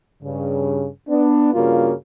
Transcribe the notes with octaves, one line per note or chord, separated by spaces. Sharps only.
G2 C#3
B3 D4
G2 C#3 A#3 F4 F#4